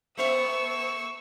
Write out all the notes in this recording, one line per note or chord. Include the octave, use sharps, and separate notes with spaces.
A3 A#3 E5 C#6 E6